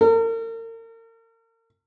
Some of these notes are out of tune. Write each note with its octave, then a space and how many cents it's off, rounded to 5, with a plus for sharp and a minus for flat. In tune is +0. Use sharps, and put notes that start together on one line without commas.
A#4 -40